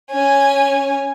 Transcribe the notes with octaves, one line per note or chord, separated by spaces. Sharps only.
C#4 G#5